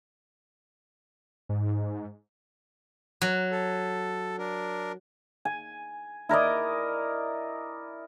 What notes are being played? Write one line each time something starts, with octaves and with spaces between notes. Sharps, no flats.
G#2
F#3
A4
D4 A#4
G#5
E4 A#4 D5 D#5